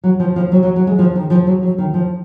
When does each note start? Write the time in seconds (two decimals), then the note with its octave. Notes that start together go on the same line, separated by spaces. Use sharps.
0.04 F#3
0.20 F3
0.36 F3
0.52 F#3
0.63 F#3
0.76 F#3
0.87 G#3
0.99 F3
1.16 D#3
1.30 F3
1.47 F#3
1.63 F#3
1.78 D#3
1.94 F3